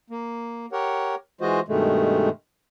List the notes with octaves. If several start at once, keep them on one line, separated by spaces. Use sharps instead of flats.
A#3
G4 A#4 C#5 F#5
E3 G#3 F4 F#4 C5 D#5
G2 B2 D#3 G#3 A3